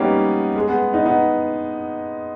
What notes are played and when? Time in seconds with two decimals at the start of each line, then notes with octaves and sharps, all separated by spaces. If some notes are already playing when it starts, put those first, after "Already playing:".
Already playing: G3 A#3 B3 C#4 D#4
0.56 G#3
0.68 G#3 B3
0.93 B3 D#4
1.06 B3 D#4